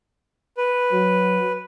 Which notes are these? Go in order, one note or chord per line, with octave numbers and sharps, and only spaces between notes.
B4
F#3